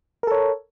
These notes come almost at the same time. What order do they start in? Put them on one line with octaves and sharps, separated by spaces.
A#4 A4 C#5